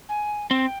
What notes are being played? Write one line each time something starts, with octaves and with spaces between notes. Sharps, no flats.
G#5
C4 G5